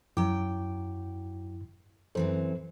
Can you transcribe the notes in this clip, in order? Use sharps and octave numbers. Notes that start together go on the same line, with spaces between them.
F#2 F#3 E4 G5 D6
F#2 E3 C4 A4 C5